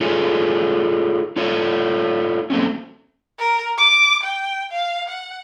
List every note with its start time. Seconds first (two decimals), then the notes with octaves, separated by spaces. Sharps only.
0.01 D#4 F4 G#4 A4 C#5
1.36 D#4 F4 A4 C#5
2.50 F#3 A3 A#3 C4 C#4
3.39 A#4
3.78 D6
4.23 G5
4.72 F5
5.09 F#5